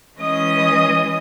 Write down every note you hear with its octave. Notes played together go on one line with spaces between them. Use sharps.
E3 G#3 C#4 D#5 D#6